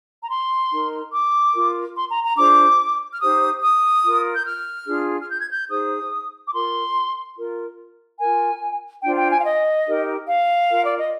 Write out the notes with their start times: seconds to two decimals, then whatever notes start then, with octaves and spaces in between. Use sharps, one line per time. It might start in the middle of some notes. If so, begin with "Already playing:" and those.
0.23 A#5
0.30 C6
0.71 D#4 A#4
1.13 D6
1.54 F4 A#4
1.96 C6
2.10 A#5
2.24 A#5
2.37 D4 F4 G#4 C5 D6
3.13 F6
3.21 D#4 G4 C5 D#6
3.63 D#6
4.03 F4 A#4
4.34 G6
4.45 F6
4.87 D4 F4 G#4
5.20 F6
5.29 G6
5.40 G#6
5.49 G6
5.70 D#4 G#4 C5 D#6
6.47 D6
6.53 F4 A#4 C6
7.36 F4 A#4
8.19 F4 A#4 G#5
9.02 D4 F4 C5 G5
9.17 G5
9.31 G#5
9.40 F5
9.45 D#5
9.87 D#4 G4 A#4
10.28 F5
10.70 F4 A#4
10.85 D5
10.99 D#5